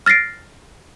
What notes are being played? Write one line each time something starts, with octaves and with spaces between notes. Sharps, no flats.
F6 A6 A#6 C7 D7